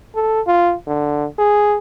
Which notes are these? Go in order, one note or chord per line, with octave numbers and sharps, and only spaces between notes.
A4
F4
D3
G#4